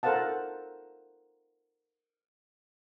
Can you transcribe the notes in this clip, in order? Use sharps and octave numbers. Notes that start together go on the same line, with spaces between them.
A4 A#4 C5 F5 F#5 A5